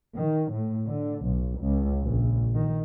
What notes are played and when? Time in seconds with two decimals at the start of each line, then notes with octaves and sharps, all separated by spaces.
0.17 D#3
0.52 A2
0.87 D3
1.26 B1
1.61 C#2
2.03 A#1
2.54 D#3